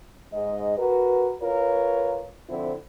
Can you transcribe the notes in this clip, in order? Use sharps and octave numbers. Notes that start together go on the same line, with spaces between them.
G#2 D#5
F#4 A#4 B4
F4 A#4 B4 C#5
D3 F3 C4 E4